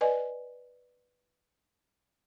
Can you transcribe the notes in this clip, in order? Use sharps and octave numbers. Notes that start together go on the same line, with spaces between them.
B4 D5 D#5 G#5